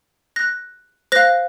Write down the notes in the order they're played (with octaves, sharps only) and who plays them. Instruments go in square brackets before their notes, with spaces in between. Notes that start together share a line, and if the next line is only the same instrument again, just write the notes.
[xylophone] F#6 A#6
C5 F5 F#6 A#6